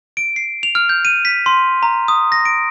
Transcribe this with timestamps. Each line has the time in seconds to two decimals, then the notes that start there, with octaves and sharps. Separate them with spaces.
0.17 D7
0.36 C7
0.63 F7
0.75 F6
0.89 G6
1.05 D#7
1.25 B6
1.46 C6
1.83 A#5
2.08 D#6
2.32 A#6
2.45 D7